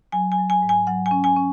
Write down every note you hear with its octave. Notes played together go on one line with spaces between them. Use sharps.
F#3 G#5
G#5
F#3
G#5
G#2
G#5
F#3 F#5
G#5
C#4
G#5
C#4